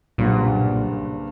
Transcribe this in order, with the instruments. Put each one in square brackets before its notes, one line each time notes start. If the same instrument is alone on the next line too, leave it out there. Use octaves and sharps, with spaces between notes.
[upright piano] F#1 G2 F#5 [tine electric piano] B1 [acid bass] A#2